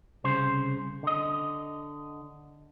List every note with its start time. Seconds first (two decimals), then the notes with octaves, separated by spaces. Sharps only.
0.24 C2 C#3 C5
1.03 D3 D#5